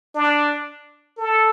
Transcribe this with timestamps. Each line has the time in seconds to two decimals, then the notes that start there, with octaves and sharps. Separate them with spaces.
0.15 D4
1.18 A4